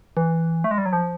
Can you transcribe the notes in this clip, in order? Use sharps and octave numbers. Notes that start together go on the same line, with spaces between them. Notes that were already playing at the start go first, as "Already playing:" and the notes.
E3
A3
G#3
G3
F#3
F3